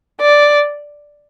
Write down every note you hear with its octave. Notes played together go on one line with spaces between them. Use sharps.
D5